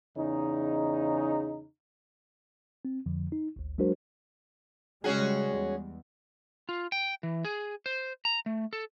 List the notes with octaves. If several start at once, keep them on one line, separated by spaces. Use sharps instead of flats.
E2 C#3 D#4
C4
F2 D3 F3
D#4
G#1 D2
F#3 G#3 D4 F#4 A#4 C5
C#3 G3 G#3 C#4 F#4 G#4
E2
F4
G5
E3
G#4
C5
A#5
A3
A4